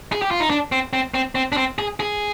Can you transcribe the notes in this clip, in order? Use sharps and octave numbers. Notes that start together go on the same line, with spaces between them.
G#4
G4
F4
D#4
D4
C4
C4
C4
C4
D4
C4
G#4
G#4